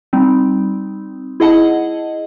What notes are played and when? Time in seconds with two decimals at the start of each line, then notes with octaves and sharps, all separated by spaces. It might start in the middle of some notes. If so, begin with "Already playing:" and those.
0.13 G3 C4 D#4
1.40 E4 G#4 D#5 F#5 A5